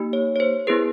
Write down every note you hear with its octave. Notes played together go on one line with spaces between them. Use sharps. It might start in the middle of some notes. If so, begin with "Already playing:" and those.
Already playing: A#3 D#4 G4
C#5
C#5
C5
B3 E4 G#4 B4